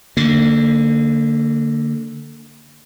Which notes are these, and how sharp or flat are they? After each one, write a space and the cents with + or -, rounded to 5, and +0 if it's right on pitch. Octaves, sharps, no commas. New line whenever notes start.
D3 +0 A#3 -30